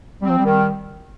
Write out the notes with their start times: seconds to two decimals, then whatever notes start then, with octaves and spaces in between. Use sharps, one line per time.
0.22 G3 C4
0.29 F3
0.38 G3
0.44 D#3